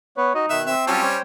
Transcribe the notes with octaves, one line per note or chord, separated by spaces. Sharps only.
B3 B4 C#5
D#4 F#4 D#5
B2 D#3 E5 F#6
C4 E5
F#3 G3 C#4 F4 A5
C5 C#5 G5